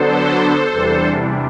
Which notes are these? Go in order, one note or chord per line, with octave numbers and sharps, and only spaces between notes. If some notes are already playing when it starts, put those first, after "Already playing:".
Already playing: D3 F#3 B3 D4 A4 C5
E2 C3 E3 G3 D4